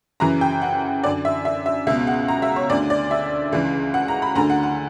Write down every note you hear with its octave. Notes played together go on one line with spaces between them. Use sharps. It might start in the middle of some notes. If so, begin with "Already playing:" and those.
F#2 C#3 E3 A#5
G5
F#5
F#2 D3 D5
E5
E5
E5
C#2 B2 E5
F#5
A#5
E5
C#5
D2 D3 D5
D5
E5
C#2 C#3 E3
F#5
A#5
B5
D2 D3 A#5
F#5
F#5